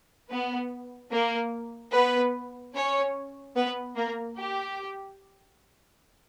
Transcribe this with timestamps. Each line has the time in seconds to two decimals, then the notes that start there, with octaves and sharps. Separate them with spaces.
0.29 B3 B4
1.11 A#3 A#4
1.93 B3 B4
2.74 C#4 C#5
3.56 B3 B4
3.96 A#3 A#4
4.37 G4